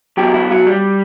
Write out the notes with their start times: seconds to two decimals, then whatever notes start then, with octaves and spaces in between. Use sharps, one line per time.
0.17 B1 B2 F#3 G4
0.34 E4
0.51 F#3
0.67 G3